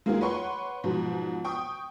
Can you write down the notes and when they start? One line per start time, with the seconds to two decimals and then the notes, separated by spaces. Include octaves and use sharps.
0.06 G#3 A#3 D#4 F4 F#4 G#4
0.21 B4 C#5 F#5 C6 C#6
0.84 G#2 B2 F3 F#3
1.44 G5 C#6 D#6